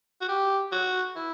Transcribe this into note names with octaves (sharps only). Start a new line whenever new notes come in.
F#4
G4
F#4
E4